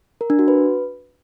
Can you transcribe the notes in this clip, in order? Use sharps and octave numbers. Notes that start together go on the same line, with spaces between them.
A#4
D4
F#4
B4